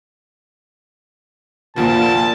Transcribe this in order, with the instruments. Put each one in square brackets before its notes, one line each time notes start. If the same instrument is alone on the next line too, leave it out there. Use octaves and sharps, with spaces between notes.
[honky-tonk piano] F1 D2 F3 [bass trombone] A#2 [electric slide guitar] A#3 F4 F#4 [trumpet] A5